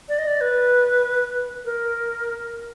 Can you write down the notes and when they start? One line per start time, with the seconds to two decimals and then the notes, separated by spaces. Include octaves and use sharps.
0.09 D5
0.18 D#5
0.27 D5
0.41 B4
1.65 A#4